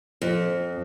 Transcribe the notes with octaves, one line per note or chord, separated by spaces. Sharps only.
F2